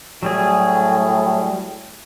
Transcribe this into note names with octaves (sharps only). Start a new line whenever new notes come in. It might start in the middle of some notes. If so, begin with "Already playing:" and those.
A2 F#3 G3 G#4